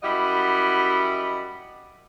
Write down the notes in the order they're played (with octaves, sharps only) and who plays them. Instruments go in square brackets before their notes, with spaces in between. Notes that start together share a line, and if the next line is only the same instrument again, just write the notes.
[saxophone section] F#2 G3 E4 D#5 F#5